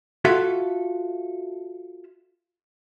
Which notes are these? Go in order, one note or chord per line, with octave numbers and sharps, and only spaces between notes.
F4 F#4 A4 E5 F5